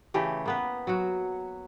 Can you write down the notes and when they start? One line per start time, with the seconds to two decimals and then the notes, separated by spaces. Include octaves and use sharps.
0.14 C#3 E3 A3 G4
0.46 A#3 B3 B4
0.87 F#3 F#4